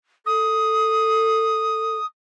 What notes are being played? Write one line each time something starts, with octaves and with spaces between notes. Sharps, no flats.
A4 D#6